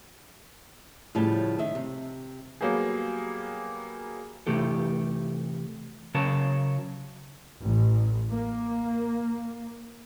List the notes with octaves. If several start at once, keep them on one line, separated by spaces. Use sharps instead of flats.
A2 C#3 F3 G3 A5
D#3 E5
C3
F#3 G3 A#3 B3 G4 G#4
C3 E3 A3 G4 A4
C#3 F#3 A#4 C#5 A5
A1
A#3